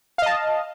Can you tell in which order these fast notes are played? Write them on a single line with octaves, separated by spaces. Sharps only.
F5 D#5 A5